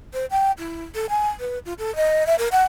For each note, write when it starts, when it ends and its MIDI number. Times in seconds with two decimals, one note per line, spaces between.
0.13 0.25 72
0.31 0.52 79
0.58 0.84 64
0.95 1.06 69
1.10 1.28 80
1.40 1.58 71
1.65 1.73 65
1.79 1.94 69
1.96 2.26 75
2.26 2.35 76
2.38 2.48 70
2.52 2.64 78